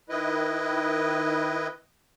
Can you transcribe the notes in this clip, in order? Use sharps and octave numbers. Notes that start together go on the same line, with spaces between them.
D#3 E4 B4 D#5